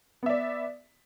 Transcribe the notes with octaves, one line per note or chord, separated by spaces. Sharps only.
B3 D5 E5